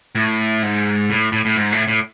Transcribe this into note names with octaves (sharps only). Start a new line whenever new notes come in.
A2
G#2
A2
A2
A2
G#2
A2
A2